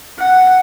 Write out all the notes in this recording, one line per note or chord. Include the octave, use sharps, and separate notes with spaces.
F#5